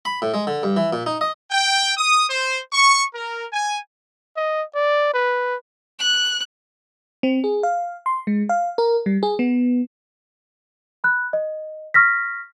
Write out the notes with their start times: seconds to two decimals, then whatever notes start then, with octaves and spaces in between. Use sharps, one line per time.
0.05 B5
0.22 A2
0.34 G#3
0.47 D3
0.63 G2
0.77 E3
0.93 A#2
1.06 D#4
1.21 D#5
1.51 G5
1.97 D#6
2.29 C5
2.72 C#6
3.13 A#4
3.53 G#5
4.37 D#5
4.75 D5
5.14 B4
5.99 F#6
7.23 C4
7.44 G#4
7.63 F5
8.06 C6
8.27 G#3
8.49 F5
8.78 A#4
9.06 G3
9.23 G#4
9.39 B3
11.04 B5 F#6
11.33 D#5
11.94 C#6 F6 A#6 B6